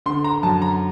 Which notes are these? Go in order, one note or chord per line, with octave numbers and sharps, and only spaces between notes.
D3 C6
A#5
F#2 A5
A#5